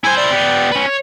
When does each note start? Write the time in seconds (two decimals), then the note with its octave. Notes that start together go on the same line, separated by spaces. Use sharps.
0.04 E4 C5 G#5
0.17 D5
0.31 B3 G4
0.72 C#4 B4
0.86 C#5